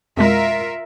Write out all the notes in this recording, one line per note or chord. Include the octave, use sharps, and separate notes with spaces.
F2 B2 G#3 F4 A#4 E5